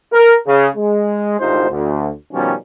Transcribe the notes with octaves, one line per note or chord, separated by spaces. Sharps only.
A#4
C#3
G#3
G#1 D2 C3 D#4 F4 C5
D2
B2 D#3 F3 G3 C#4